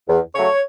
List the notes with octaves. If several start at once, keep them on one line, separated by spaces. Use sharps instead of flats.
E2
C#3 F#3 A3 C#5